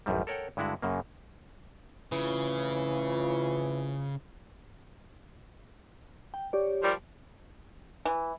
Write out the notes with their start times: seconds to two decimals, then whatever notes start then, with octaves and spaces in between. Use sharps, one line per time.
0.06 A1 F#2 D#3 G3
0.27 A4 A#4 C#5 F#5 G5
0.57 G2 D3 G#3 E4 F#4 F#5
0.82 F#2 C#3 A#3
2.12 F2 A2 C#3 E3 F4
6.34 G5
6.53 G4 C#5 D5
6.82 F3 G3 A#4
8.05 E3